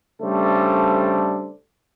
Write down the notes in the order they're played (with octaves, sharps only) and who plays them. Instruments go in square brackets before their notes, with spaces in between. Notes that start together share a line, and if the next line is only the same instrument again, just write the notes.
[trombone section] C#3 G3 A3 D4 A4 C5